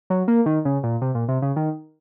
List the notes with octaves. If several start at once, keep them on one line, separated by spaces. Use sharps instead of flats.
F#3
A#3
D#3
C#3
A#2
C3
A#2
C3
C#3
D#3